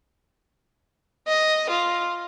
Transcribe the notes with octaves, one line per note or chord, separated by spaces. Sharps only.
D#5
F4